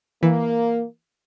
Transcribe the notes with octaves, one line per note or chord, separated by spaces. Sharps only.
E3 A#3